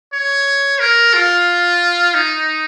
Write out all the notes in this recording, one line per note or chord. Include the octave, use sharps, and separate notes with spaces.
C#5
A#4
F4
D#4